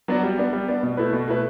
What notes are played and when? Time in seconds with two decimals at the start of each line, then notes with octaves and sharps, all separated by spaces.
0.08 F#3 B3 D4 F#4
0.23 G3
0.38 B3 D4
0.53 G3
0.68 B3 D4
0.83 B2
0.97 A3 E4 B4
1.13 B2
1.28 A3 E4 B4